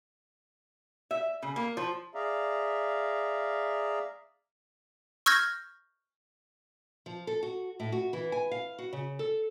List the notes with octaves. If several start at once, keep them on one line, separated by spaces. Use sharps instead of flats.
E5
C#3
A#3
F3
G#4 D5 E5 F5 A#5
C#6 E6 F6 G6 G#6 A#6
F3
A4
F#4
A2
F#4
E3
G#5
F5
F#4
C#3
A4